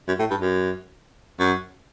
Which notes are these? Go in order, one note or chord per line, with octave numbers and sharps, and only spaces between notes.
F#2
A2
G2
F#2
F#2